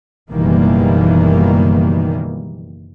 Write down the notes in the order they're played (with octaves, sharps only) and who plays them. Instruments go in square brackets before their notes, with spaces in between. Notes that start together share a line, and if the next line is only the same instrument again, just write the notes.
[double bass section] F#1 B2 D#3 E3 G3 A#3